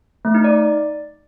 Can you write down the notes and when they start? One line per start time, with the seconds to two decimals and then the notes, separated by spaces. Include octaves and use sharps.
0.25 A3
0.35 D#4
0.44 D5